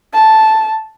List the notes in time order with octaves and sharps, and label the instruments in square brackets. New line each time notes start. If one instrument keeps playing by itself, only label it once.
[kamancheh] A5